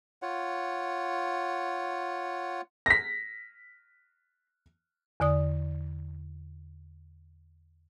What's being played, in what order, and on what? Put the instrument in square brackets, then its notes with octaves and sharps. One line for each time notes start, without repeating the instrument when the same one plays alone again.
[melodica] F4 C#5 F#5
[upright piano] A#6 B6
[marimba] E2 D3 D5 D#6